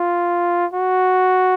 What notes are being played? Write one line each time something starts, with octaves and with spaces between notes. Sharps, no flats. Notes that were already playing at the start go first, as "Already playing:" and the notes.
Already playing: F4
F#4